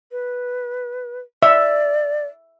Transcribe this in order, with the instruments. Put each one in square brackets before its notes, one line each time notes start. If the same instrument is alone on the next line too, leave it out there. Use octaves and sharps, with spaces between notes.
[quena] B4
[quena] D5 [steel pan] E5